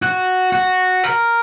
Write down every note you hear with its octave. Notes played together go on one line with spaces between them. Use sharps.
F#4
F#4
A#4